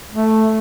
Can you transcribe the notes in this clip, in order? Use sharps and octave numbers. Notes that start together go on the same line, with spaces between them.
A3